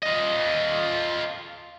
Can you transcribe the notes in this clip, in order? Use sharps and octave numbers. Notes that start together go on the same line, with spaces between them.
F4 D#5